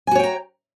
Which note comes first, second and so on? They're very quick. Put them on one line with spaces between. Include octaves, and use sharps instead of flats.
G#5 F#4 C#5 G5 A#5